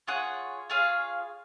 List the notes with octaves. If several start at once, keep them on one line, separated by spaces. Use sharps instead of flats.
F4 G#4 C#5 F#5
F4 G#4 C#5 F5